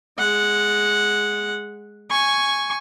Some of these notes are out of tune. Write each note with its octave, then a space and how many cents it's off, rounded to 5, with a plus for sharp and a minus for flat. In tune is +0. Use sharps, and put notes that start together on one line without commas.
G#3 +0 F#5 -10
G#5 +0 C#6 +0